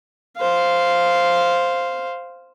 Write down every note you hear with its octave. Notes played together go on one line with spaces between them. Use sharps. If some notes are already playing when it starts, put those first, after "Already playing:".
C5 F5